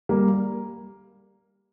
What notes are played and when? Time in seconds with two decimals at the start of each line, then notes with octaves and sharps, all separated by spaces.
0.09 G3 A#3